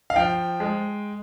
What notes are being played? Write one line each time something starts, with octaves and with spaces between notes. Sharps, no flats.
F5
F3 G5
G#3